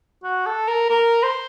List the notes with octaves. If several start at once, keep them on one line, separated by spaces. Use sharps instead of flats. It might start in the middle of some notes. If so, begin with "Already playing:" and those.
F#4
A4
A#4
A#4
C5